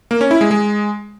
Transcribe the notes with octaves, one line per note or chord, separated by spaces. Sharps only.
A#3
C#4
E4
G#3
G#3